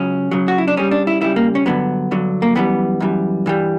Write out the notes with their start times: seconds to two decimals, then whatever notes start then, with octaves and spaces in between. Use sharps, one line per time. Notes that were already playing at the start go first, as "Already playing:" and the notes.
Already playing: C#2 C#3 F#3 C#4
0.31 C#2 C#3 F#3
0.48 F#4
0.58 E4
0.68 D4
0.76 C#2 C#3 G3 C#4
0.91 D4
1.07 E4
1.22 C#2 C#3 G3 E4
1.36 A#3
1.55 C#4
1.66 G2 D3 F#3 B3
2.11 G2 D3 F#3
2.42 A#3
2.55 F#2 E3 G3 B3
3.00 F#2 E3 G3
3.46 G2 E3 G3